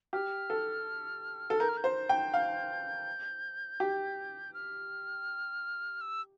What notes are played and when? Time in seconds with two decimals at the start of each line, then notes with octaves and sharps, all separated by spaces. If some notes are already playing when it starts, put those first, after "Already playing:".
0.13 G4 F6
0.50 A4
1.50 A4
1.60 A#4 G6
1.69 F6
1.77 G6
1.84 C5
2.09 G5
2.34 F5
3.80 G4
4.54 F6
6.01 E6